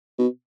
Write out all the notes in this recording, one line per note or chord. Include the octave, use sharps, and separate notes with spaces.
B2